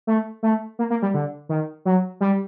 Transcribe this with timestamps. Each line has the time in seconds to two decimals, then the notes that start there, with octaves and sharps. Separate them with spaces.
0.07 A3
0.43 A3
0.79 A#3
0.90 A#3
1.02 G3
1.14 D3
1.49 D#3
1.85 F#3
2.21 G3